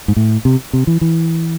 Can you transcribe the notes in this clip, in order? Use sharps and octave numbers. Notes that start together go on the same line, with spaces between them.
G#2
A2
C3
C3
E3
E3